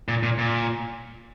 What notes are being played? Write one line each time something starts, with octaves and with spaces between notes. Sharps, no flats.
A#2
A#2
A#2